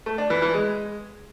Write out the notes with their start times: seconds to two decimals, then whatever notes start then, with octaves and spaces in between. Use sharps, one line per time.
0.06 A3
0.18 D4
0.30 E3
0.42 E3
0.54 G#3